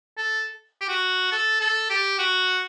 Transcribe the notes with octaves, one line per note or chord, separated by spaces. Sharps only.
A4
G4
F#4
A4
A4
G4
F#4